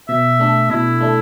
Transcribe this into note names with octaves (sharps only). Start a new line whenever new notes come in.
B2 E5
A3 D4 A4
B2 E4
A3 D4 A4